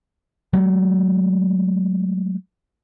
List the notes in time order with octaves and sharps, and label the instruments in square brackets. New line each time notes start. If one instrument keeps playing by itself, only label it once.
[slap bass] F#3 G#3 A3